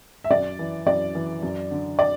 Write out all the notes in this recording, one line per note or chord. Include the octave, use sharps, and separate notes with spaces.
E5
F#2 D5
E3
F#2 D5
E3
F#2
D3
D5